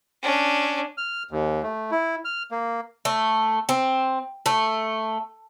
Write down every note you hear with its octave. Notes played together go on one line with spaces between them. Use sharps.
C#4 D4
F6
D#2
A3
E4
F6
A#3
A3
C4
A3